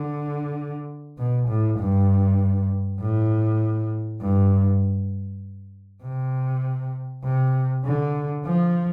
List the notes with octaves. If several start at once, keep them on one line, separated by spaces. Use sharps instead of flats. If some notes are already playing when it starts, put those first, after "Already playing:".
Already playing: D3
B2
A2
G2
A2
G2
C3
C3
D3
F3